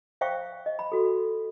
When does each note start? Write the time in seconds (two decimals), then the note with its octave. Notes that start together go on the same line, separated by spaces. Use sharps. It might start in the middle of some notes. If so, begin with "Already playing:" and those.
0.21 C5 E5 F5 G5 C#6
0.66 D#5
0.79 B5
0.92 F#4 A4